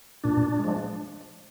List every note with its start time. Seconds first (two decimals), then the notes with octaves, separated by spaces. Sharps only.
0.24 A#2 D4
0.59 G#3
0.64 F3